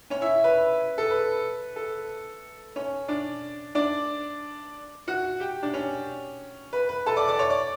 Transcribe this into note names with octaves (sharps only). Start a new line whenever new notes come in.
C#4 C#5
E4 E5
B4
A4
B4
A4
C#4 C#5
D4 D5
D4 D5
F#4 F#5
G4 G5
D4 D5
C#4 C#5
B4
B4
A4 A5
D5 D6
D5 D6
C#5 C#6
D5 D6